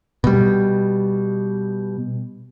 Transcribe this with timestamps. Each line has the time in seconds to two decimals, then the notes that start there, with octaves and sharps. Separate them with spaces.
0.24 B2 G3